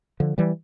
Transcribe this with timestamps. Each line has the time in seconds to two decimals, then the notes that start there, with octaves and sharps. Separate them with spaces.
0.20 D3 F3
0.38 E3 G3